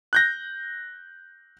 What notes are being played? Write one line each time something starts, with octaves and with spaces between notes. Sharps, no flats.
F#6 G6 A#6